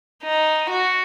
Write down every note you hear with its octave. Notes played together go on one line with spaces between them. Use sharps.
D#4
F#4